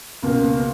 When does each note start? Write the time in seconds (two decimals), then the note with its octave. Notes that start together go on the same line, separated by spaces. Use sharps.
0.23 C#2 B2 A#3